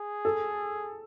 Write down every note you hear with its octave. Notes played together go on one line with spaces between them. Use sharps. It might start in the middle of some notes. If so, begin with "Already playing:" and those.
Already playing: G#4
A4